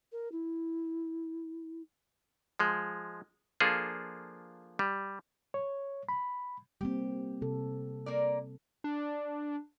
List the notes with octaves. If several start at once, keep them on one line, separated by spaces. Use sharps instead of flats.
A#4
E4
F3 G#3
F3 A#3 D4 F4 G#4 A4
G3
C#5
B5
G3 A#3 C4 G4
C3 A4
A#3 A#4 D5
D4